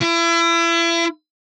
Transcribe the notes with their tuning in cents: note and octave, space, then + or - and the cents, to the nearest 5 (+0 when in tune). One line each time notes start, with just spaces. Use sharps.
E4 +35